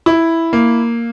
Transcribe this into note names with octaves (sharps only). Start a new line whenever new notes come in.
E4
A#3